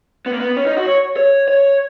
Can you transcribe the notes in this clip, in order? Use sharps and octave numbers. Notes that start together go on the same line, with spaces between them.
B3
A#3
B3
C#4
D#4
F#4
C#5
C#5
C#5